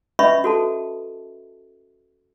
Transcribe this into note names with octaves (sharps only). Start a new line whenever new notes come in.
C#4 B4 D#5 E5 B5 C#6
F#4 A4 A5